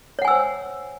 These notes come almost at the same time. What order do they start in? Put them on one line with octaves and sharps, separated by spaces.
C#5 F#5 G#5 E6 C5